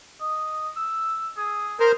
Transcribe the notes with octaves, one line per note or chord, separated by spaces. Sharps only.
D#5
E6
G#4
A#4 C5 F6